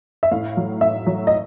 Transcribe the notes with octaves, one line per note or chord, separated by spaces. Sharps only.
E5
A2 F5
F#3
A2 E5
F#3
D#5